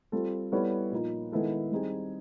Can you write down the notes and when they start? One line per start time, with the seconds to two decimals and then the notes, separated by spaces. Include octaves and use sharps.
0.12 G3 C4 F4 A4
0.52 G3 B3 E4 A4 C#5
0.91 A#2 F3 A#3 D#4
1.32 D#3 G#3 B3 E4 A4
1.72 G3 C4 D#4 G#4